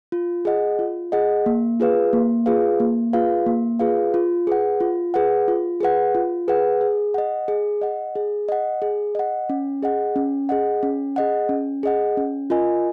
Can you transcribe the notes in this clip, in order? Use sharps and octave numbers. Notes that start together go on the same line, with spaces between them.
F4
G#4 D#5 F#5
F4
G#4 D#5 F#5
A#3
F4 G#4 B4 F5
A#3
F4 G#4 B4 F5
A#3
F4 G#4 B4 F5
A#3
F4 G#4 B4 F5
F4
G#4 B4 F#5
F4
G#4 B4 F#5
F4
G#4 B4 F#5
F4
G#4 B4 F#5
G#4
D#5 F#5
G#4
D#5 F#5
G#4
D#5 F#5
G#4
D#5 F#5
C#4
G#4 D#5 F#5
C#4
G#4 D#5 F#5
C#4
G#4 D#5 F#5
C#4
G#4 D#5 F#5
C#4
F4 A#4 D#5 G#5